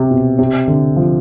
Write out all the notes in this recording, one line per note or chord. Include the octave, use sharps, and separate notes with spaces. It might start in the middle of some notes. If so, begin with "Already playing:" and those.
Already playing: C3
B2
C3
D3
F3